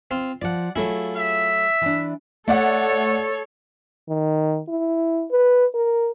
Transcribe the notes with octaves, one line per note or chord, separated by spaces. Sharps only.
C4 F4
F3 F4 D5 F#5
F#3 A3 E4 F4 G#4
E5
E3 D4
A3 A4 C#5 D5 F#5
D#3
E4
B4
A#4